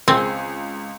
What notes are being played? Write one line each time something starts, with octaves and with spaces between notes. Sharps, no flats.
C#2 C4 G#4